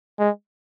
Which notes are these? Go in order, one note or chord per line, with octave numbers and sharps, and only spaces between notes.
G#3